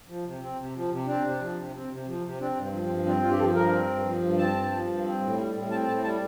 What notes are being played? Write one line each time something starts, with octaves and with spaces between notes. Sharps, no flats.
F3
C3
C4
C3
F3
C3
C4 D4
C3
F3
C3
C4
C3
F3
C3
C4 D4
G2
C4
F3
C4
G2
C4 D4
G2 F4
G4
F3 A4
G2 A#4
C4
G2
F3
G2
C4 A5
G2
F3
G2
C4
A2
G3
A2
C4 A5
A2 A5
G3 A5